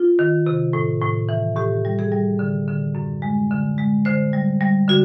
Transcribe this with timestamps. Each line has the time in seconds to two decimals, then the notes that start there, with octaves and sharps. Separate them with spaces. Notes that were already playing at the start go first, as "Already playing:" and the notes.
Already playing: F4
0.19 D#3
0.46 C3
0.73 A2
1.02 A2
1.29 E3
1.56 A2 G4
1.85 G3
1.99 G#4
2.12 G3
2.39 D3
2.68 D3
2.95 F#2
3.22 G#3
3.51 D3
3.78 G#3
4.05 D3 C5
4.33 G3
4.61 G3
4.88 D3 F#4